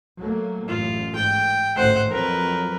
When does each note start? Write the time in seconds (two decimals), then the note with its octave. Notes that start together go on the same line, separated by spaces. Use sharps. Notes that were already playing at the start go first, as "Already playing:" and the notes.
0.19 F#3 A3 A#3
0.68 A1 F#2 F4
1.16 G#2 G5
1.76 A1 D2 G#2 C5 F#5
2.11 F2 F3 F#3 A#4 B4